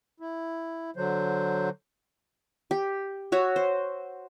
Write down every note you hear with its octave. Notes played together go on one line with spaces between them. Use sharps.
E4
D3 F#3 C5
G4
F#4 C#5 E5
C5